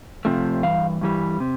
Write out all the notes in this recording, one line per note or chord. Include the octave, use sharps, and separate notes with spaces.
F2 C3 F3 A3
G2 E3 F5
G2 E3 G3
C3